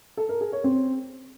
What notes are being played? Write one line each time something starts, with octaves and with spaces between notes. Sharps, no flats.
A4
A#4
G#4
C#5
C4